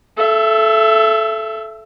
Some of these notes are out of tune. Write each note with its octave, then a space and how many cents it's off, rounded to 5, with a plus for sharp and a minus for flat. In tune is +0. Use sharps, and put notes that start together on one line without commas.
A4 -15 E5 +25